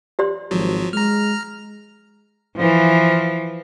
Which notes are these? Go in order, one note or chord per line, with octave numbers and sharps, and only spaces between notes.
G4 D5 C6
G#1 F3 F#3
G#3 A#5 F6
E3 F3